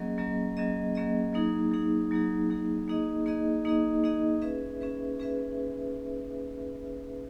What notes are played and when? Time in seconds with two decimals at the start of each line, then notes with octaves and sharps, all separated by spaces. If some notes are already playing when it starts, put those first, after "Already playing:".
Already playing: F#3 A#3 C#4 G#4 D#5
0.18 F#3 A#3 C#4 G#4 D#5
0.57 F#3 A#3 C#4 G#4 D#5
0.95 F#3 A#3 C#4 G#4 D#5
1.33 F#3 A#3 D#4 G#4
1.71 F#3 A#3 D#4 G#4
2.11 F#3 A#3 D#4 G#4
2.50 F#3 A#3 D#4 G#4
2.88 A#3 D#4 G#4 D#5
3.26 A#3 D#4 G#4 D#5
3.65 A#3 D#4 G#4 D#5
4.04 A#3 D#4 G#4 D#5
4.42 C#4 G#4 B4 E5
4.81 C#4 G#4 B4 E5
5.19 C#4 G#4 B4 E5